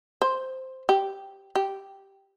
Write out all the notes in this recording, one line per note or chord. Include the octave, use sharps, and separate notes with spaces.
C5
G4
G4